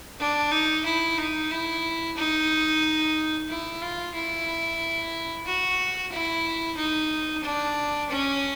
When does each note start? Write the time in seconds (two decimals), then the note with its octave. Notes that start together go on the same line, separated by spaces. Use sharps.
0.20 D4
0.52 D#4
0.85 E4
1.18 D#4
1.51 E4
2.17 D#4
3.49 E4
3.82 F4
4.15 E4
5.46 F#4
6.12 E4
6.77 D#4
7.44 D4
8.10 C#4